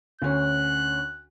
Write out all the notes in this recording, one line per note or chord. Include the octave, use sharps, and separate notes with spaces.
D2 C#4 F#6